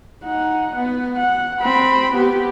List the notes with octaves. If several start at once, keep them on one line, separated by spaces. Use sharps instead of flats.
D#4 F#5
B3
F#5
C4 B5
B3 G4